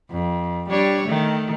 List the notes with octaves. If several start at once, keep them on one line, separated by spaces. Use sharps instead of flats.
F2
G3 D4 C#5
D#3 A3